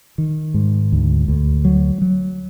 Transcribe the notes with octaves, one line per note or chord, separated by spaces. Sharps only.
D#3
G#2
D2
D2
F#3
F#3